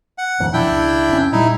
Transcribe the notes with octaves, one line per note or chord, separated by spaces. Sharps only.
F#5
D1 F2 E3
E1 B2 F3 D4 E4 G5
C#2
F1 C#4
A#2 G3 D#4 E4